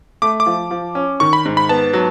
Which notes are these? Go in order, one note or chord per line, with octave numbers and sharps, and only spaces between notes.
A3 D6
D6
F3
F3
C#4
D#3 C#6
B5
G#2
B5
B3 A5
F#3